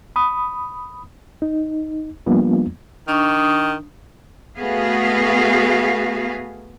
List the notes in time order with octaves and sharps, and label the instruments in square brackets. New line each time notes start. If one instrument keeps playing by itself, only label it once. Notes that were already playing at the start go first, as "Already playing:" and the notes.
[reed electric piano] B5 D#6
D#4
F3 G3 A#3 B3 D4 F4
[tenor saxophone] D#3 [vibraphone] D4 C#6 D#6
[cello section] A3 B3 F#4 G#4 F5